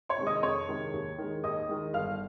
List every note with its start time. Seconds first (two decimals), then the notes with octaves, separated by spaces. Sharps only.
0.09 C#5 C#6
0.18 C3 D#3 G#3
0.27 D#5 D#6
0.43 F2 C#5 C#6
0.68 C3 D#3 G#3
0.93 D#2
1.18 D#3 G#3
1.44 D#2 D#5 D#6
1.69 D#3 G#3
1.94 G1 F5 F6